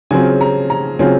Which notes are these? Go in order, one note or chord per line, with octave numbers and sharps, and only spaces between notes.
C#3 F#3 C4 F4 G#5
A#5
A#5
C#3 F#3 C4 F4 G#5